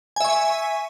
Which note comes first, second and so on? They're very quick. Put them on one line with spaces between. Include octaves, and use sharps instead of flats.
G#5 E5 C#6